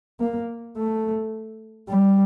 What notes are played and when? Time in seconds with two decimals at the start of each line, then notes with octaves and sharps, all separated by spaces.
0.20 A#3
0.77 A3
1.89 G3